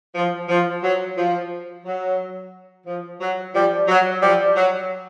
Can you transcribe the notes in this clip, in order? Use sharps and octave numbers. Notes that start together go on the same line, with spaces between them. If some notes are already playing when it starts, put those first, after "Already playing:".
F3
F3
F#3
F3
F#3
F3
F#3
F3 G3
F#3
F3 G3
F#3